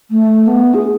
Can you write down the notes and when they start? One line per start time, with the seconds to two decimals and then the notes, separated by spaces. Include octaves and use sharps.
0.11 A3
0.47 B3
0.74 G#4